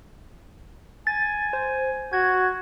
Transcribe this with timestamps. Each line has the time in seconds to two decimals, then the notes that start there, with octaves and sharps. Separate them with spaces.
1.07 G#5 A6
1.53 C5
2.13 F#4 G#6